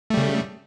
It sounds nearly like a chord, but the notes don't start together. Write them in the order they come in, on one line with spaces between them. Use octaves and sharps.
A3 G3 C#3